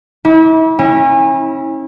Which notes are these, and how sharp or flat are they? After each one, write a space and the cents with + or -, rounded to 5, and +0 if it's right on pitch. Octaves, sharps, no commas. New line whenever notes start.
E4 -40 D6 -20
C#4 -35 E4 -15